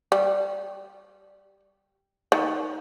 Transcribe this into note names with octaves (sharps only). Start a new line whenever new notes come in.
G3
D#3